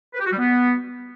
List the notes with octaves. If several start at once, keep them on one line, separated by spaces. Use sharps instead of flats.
B4
G4
F#4
G3
B3